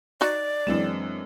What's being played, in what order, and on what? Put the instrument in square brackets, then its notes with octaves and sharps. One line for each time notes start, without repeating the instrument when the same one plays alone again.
[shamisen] D#4 F#4 [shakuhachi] D5
[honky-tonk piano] F#2 E3 E7 [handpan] G#3 C4 D4